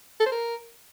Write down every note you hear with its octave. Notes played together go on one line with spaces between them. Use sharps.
A4
C5
A#4